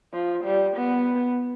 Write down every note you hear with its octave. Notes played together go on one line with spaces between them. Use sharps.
F3
G3
B3